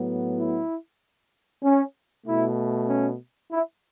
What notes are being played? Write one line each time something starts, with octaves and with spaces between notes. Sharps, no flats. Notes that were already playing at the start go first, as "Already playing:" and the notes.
Already playing: A2 F#3 B3
E4
C#4
B2 A3 E4
C#4
E4